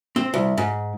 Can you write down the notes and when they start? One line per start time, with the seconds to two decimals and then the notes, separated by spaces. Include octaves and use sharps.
0.16 C4
0.34 C2
0.58 G#2